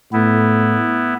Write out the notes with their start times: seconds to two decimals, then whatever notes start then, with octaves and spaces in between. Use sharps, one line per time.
0.13 A2 B3 E4